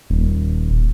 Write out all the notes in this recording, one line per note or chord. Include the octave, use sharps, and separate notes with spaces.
D#1